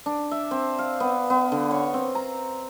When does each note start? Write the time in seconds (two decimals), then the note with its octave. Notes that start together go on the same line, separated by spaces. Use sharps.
0.06 D4
0.31 E5
0.51 C4
0.79 F5
1.00 B3
1.30 B3
1.52 D3
1.71 C#5
1.94 C4
2.15 A#5